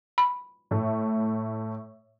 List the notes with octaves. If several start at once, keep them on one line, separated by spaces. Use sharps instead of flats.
B5
A2 A3